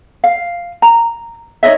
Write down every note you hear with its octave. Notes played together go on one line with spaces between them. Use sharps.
F5
A#5
D#4 C#5 D#5 E5